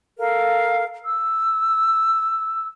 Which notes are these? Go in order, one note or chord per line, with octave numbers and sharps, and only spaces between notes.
A4 A#4 F5
E6